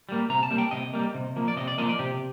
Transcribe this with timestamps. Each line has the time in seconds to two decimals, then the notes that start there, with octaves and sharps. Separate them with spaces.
0.09 G3 A#3
0.29 C3 A#5
0.43 A5
0.50 G3 A#3
0.58 G5
0.71 C3 D#5
0.93 G3 A#3
1.14 C3
1.36 F3 A#3
1.48 D5
1.56 C3 D#5
1.68 D5
1.78 F3 A#3 D#5
1.89 D5
1.99 C3 G4